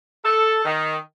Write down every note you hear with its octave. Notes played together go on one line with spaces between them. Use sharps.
A4
D#3